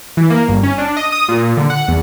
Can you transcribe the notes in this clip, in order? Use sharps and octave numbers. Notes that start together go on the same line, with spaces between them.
E3
A#3
G1
C#4
D4
D#5
D#6
A#2
D3
F#5
E2